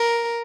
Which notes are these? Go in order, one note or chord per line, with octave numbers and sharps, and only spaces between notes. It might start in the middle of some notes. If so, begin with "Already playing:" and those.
Already playing: A#4